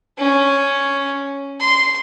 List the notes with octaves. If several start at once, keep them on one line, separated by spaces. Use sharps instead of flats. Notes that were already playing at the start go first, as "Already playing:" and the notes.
C#4
C6